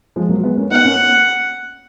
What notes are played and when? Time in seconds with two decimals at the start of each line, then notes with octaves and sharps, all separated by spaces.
0.16 F3 G#3
0.29 F#3 A#3
0.43 G#3 B3
0.57 A#3 C#4
0.71 B3 D#4 F#5
0.85 A#3 C#4